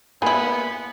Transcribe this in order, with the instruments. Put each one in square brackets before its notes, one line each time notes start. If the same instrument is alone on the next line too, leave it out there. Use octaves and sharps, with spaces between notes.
[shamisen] A#3 E4 [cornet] B3 [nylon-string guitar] G#5 [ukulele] B5